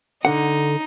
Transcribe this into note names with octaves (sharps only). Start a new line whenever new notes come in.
D3 D#4 F#5